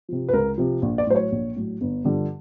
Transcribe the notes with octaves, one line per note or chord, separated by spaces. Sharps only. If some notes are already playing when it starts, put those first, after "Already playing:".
C3 F3
B4
C#2 A#4
C3 F3
A#1
D5
A2 F#3 C5
C#5
A#1
A2 F#3
G1
G2 D3 F3